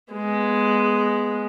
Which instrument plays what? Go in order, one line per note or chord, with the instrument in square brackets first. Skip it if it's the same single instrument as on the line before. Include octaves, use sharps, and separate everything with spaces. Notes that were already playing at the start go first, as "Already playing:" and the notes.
[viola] G#3 B3